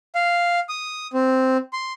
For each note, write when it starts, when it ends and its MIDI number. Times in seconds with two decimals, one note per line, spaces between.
0.15 0.59 77
0.69 1.07 87
1.13 1.57 60
1.73 1.93 84